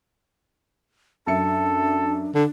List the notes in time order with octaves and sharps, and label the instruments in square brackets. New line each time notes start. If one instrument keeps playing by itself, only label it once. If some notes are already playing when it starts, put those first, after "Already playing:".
[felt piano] F#2 E5 C#7 [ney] D4 [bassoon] A4
[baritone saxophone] D3 [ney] D4